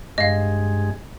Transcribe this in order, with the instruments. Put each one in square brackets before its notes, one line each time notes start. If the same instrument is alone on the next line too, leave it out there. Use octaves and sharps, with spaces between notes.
[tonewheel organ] G2 G#3 [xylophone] D#5 F5